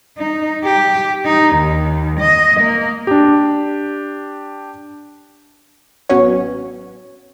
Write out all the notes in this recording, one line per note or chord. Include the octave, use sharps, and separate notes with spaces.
D#4
G4
D#4
D#2
D#5
A#3
D4 G4
A1 F#3 B3 C#4 C#5